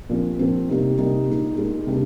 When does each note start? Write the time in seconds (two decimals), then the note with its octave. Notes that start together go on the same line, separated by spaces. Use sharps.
0.10 A#2 F3 C4
0.39 A#2 F3 C4
0.69 C3 G3 A#3 D#4 G4
0.98 C3 G3 A#3 D#4 G4
1.28 A#2 G#3 D#4
1.57 A#2 G#3 D#4
1.87 C3 G3 A#3 D4